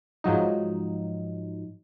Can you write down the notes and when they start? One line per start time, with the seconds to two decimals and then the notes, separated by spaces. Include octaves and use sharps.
0.24 G#2 F3 F#3 D#4